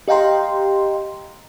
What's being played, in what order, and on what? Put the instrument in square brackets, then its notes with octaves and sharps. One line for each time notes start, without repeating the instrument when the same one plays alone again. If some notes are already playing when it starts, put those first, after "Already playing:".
[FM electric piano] G4 D#5 F5 G5 A#5 C6